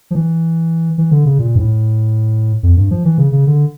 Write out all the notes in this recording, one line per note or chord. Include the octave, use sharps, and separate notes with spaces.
F3
E3
E3
D3
C#3
A#2
G2
A2
F2
G2
F3
E3
C#3
C#3
D3